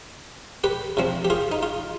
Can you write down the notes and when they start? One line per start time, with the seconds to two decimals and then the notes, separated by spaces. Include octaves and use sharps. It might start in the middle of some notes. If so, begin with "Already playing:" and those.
0.64 G4 B4
0.97 C3 F3 C4
1.25 G4
1.30 F4 G#4
1.52 D#4
1.63 F4